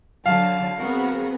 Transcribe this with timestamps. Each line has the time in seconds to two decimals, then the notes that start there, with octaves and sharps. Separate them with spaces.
0.26 D3 F#3 F5 A5
0.77 B3 C4 F#4 G#4 A#4